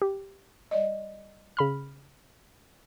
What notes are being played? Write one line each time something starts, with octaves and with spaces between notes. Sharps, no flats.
G4
G3 D5 D#5
C#3 B5 F6